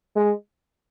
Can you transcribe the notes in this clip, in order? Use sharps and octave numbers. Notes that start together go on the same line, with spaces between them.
G#3